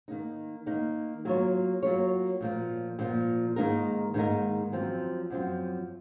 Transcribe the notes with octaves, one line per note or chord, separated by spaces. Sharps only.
D#3 A#3 D#4
D#3 A#3 D#4
F#3 A#3 F4 A#4 C#5
F#3 A#3 F4 A#4 C#5
A#2 F3 A#3
A#2 F3 A#3
G#2 D#3 A#3 D#4 A#4
G#2 D#3 A#3 D#4 A#4
F#2 F3 C4
F#2 F3 C4